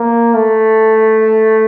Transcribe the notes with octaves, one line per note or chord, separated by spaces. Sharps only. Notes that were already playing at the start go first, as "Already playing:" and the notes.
Already playing: A#3
A3